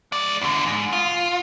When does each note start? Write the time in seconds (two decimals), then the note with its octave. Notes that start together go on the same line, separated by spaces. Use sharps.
0.12 G#3 D5
0.41 E2 D3
0.66 G#2
0.93 F4